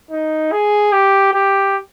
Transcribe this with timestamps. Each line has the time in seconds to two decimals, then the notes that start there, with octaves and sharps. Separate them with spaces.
0.11 D#4
0.52 G#4
0.92 G4
1.33 G4